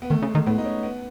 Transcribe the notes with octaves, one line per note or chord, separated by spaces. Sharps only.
B3
D#3 A3
C#3
G#3
D#3
A2 B3
D#4
C#4
B3